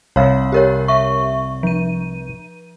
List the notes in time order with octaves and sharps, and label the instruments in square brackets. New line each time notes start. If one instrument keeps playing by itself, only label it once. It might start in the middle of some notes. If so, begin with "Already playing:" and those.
[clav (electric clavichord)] C2 [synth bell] C#5 F5
[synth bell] G4 A#4 C#5
E5 C#6
F3 D#7